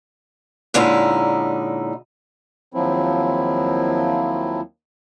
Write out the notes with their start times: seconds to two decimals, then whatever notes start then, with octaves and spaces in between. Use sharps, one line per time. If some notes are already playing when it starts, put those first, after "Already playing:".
0.74 A#2 D3 G#3 C#4 D#4 E4
2.74 D#2 F3 F#3 C4 E4